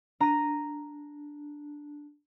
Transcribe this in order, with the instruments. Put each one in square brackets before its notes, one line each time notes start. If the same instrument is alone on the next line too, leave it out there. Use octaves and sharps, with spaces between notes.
[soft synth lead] D4 [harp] A#5 D#7